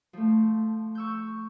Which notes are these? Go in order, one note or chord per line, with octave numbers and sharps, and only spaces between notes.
F3 A3
C#6 E6 G6